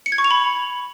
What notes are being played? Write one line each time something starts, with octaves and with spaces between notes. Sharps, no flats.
C#7
G#6
C#6
F7
B5